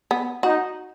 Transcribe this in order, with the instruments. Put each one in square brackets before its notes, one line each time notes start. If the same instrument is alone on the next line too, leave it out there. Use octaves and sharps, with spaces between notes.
[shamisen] B3
[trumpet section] D#4 [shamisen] F#4